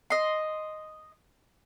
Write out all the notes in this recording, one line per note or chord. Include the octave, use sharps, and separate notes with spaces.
D#5 C6